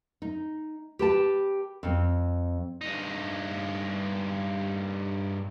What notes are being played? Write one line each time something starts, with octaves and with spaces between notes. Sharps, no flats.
D#4
G4 B4 A5
F2 C4
G2 D#4